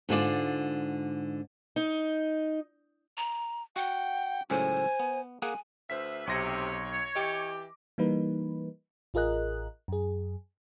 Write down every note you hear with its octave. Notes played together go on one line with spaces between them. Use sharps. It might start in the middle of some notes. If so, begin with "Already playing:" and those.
G#2 D3 F4 D5
D#4
A#5
F#4 F#5 G5
C#2 F#2 A2 C5 G#5
B3
A#3 G#4 F#5 G#5
D2 B4 C5 E5 B6
B1 C3 C#5 C6 A#6
E3 G4 D#5 D6
E3 G3 A#3 D#4 B4
A1 F4 G#4 A#4 D#5 F#6
F#2 G#4